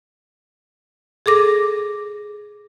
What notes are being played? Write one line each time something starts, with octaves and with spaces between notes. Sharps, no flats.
G#4 A4 D6 A#6